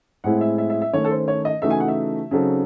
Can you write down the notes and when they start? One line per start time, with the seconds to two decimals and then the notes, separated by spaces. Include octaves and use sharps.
0.24 A2 G#3 C4 E4 F#5
0.41 E5
0.58 E5
0.70 E5
0.82 E5
0.93 D#3 A3 C#4 C#5
1.04 A4
1.11 C5
1.28 C#5
1.45 D#5
1.62 C#3 E3 A3 D#4 F#4 E5
1.70 G#5
1.80 F#5
1.88 E5
2.31 C#3 F#3 C4 D#4 A4